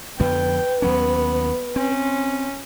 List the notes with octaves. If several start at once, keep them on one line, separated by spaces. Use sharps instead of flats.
F2 D3 B3 B4 G5
D#2 F#3 B3 C#4
C4 C#4